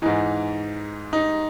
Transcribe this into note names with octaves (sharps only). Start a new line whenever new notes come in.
G#2 E3 D#4
D#4